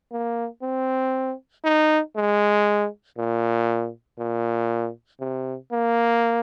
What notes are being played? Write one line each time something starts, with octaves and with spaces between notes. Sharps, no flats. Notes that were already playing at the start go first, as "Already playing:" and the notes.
A#3
C4
D#4
G#3
A#2
A#2
C3
A#3